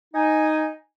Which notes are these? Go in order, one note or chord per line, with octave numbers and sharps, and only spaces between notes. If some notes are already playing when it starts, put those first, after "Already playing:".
D#4 G#5